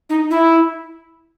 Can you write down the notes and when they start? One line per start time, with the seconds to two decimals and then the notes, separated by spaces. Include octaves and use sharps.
0.10 D#4
0.31 E4